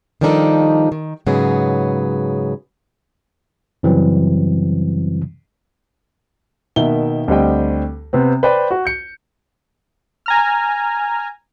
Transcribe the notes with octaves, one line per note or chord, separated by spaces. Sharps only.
D#3 F3 G3 D4 D#4 A4
D#3
G#2 C#3 F#3 B3 G#4
F#2 C#3 E3 F#3 G3 C4
B2 D#3 A#3 E5 G7
D2 G3 C4 G4 D#5 G5
C3 B3 C4
B4 C5 D5 G5
F#4
G6 C#7
G#5 A#5 F6